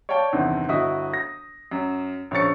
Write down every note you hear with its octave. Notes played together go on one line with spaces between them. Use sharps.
C#5 D5 F5 G5 A5
E2 G2 C3 D#3 C4
G1 E4 F#4 D#5 D#6 B6
A#6
F#2
A#1 C#3 C#5 C#6 A6 C#7